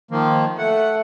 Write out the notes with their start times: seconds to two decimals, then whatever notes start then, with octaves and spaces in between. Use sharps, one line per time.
0.11 D#3 F3 A#3
0.58 A3 F#5